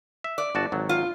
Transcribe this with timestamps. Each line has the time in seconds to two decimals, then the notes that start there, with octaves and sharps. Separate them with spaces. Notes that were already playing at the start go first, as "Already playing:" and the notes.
0.24 E5
0.38 D5
0.55 G1 F#4 A5
0.72 G#1 F#3
0.89 F4